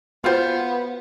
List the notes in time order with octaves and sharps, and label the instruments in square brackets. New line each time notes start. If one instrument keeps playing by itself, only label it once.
[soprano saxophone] B3 [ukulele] F4 C5 [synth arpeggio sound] F#4 F5 G5